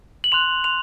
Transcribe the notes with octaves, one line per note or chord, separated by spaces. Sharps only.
F#7
C6 F#6 F7
C6 F#6 F7